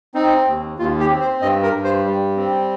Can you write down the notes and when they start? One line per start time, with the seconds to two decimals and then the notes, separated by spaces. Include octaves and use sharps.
0.15 C4 D#4
0.46 D#2
0.78 D#2 F4
0.99 G4
1.10 C4
1.20 C5
1.41 G2 D#5
1.63 A#4
1.74 G2
1.84 C5
2.04 G3
2.37 C4